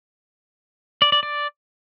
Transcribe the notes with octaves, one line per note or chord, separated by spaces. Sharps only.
D5
D5
D5